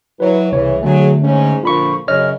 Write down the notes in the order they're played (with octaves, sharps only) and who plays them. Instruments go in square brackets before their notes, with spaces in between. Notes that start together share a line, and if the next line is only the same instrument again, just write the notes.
[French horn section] E3 F#3 [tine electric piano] B4 C#5
[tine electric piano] C2 C#5 [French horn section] C#3 E3
[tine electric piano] D3 A3 [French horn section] F#3 G#4
[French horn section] G#2 C#4
[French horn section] A#2 D3 F3 [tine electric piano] F4 B5 C#6
[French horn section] F#2 C#3 [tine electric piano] C#5 D#5 F6